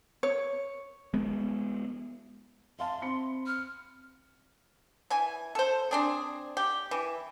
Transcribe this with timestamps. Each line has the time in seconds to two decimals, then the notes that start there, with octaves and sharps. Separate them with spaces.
0.23 C#5
1.14 G#3 B3
2.79 E5 F5 A5 C6
3.01 C4 B5 C#7
3.46 F6
5.10 E3 G#5
5.55 A4 C5
5.91 C4 D4 G#4
6.57 G4
6.91 E3